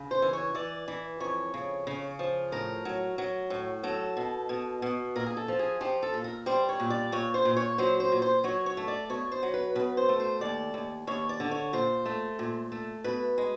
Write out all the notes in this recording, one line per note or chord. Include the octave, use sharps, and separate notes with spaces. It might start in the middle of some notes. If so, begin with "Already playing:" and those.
Already playing: C#3
C5
E3
C#5
E3 D5
E3
F2 C#5
C#3
C#3
F3
A2 A#4
F#3
F#3
A2
F#3 A4
B2
B2
B2
A#2 A#4
G#4
A4
F3
G#4
F3 G4
A4
A#2
A#4
G3 C5
C#5
A#2
D5
A#2 C#5
C5
A#2
C#5
F#3 C5
C5
A#2
C5
F#3 C#5
C#5
A3
D5
B2 C#5
C5
F#3
B4
B2 B4
C5
A3
C5
D#2 D5
D#2
D#2 C#5
D5
D3
C#5
A#2 C5
A3
A#2
A3
B2 B4
G#3